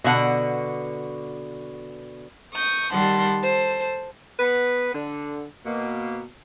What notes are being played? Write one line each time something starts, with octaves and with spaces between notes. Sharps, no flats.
B2 D3 F#5
C#6 D#6 G6
D#3 G3 F#5 A5 C6
A4 C5
B3 B4
D3
B2 A#3